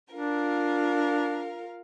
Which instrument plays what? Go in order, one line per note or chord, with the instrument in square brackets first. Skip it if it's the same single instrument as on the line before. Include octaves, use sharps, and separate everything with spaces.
[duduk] D4 [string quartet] F4 A#4 F5